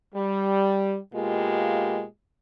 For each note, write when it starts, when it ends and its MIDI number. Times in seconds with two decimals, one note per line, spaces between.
0.15 0.97 55
1.14 2.04 47
1.14 2.04 56
1.14 2.04 58
1.14 2.04 65
1.14 2.04 67